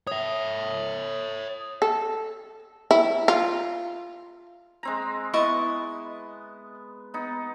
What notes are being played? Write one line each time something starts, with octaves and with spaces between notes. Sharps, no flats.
C#5 E5 D#6
A4
E4
F4
G#3 C4 A#5
B3 E4 D#5 C#6
B3 D#4